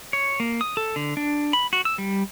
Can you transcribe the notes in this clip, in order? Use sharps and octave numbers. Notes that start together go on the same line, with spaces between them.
C#5
A#3
D#6
A4
D3
D4
B5
F#4
E6
G3